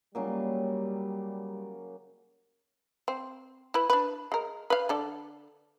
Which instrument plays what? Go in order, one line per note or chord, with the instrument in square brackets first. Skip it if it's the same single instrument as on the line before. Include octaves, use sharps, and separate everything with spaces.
[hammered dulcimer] C#3 F#3 A#3 [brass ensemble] G3
[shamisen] C4
E4 B4
D4 B4
G#3 A#4
B4 F5
D3 A4 D5